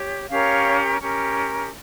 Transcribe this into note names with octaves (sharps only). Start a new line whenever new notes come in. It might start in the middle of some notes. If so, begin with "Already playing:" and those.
Already playing: G4 C#5
C#4 G4 A#4 C#5 F5
C#4 G4 A#4